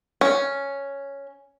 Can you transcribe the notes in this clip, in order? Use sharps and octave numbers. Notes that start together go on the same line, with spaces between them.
C#4